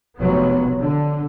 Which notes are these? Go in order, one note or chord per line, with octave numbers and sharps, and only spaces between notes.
F1 F#3 B3
D3